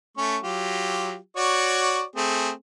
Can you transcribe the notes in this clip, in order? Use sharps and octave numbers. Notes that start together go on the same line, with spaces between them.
A3 C#4 C#6
F#3 F4 G4
F#4 C#5 D5
A3 C4 G#4